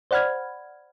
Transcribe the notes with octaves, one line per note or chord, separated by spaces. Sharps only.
C5 D5 F#5 B5 F6 G#6